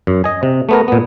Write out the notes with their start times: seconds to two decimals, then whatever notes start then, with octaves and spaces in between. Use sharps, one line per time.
0.07 F#2
0.24 D#5 G#5
0.43 C3
0.69 A3 B3 A#4
0.88 A#2 B3